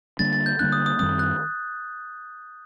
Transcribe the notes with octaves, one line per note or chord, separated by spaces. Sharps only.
D3 G3 A#3 D4 A6
A6
G6
D3 G3 A#3 D4 F#6
D#6
D#6
F#2 D#3 G3 C4 D#6
F#6